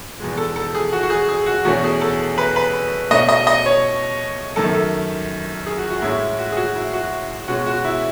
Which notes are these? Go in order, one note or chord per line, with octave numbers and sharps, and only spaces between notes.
E2 B2 G#3
A4
A4
G#4
F#4
F#4
G#4
G#4
F#4
E2 B2 A3 C#4 F#4
G#4
A4
B4
B4
B2 A3 C#4 D#5
D#5
D#5
C#5
F#2 D#3 A3 A4
A4
G#4
F#4
F#4
A2 G#3 C#4 E4
F#4
G#4
F#4
E4
F#4
B2 G#3 C#4 F#4
F#4
E4